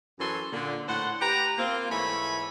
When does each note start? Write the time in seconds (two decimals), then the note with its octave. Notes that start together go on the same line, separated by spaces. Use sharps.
0.19 F#2 E3 F#3 C#4 A4 C6
0.53 A#2 D3
0.88 A2 C5 F#5
1.21 G4 B4 A#5
1.58 A#3 C4 F4
1.90 G#2 E3 A3 C#5 G#5 B5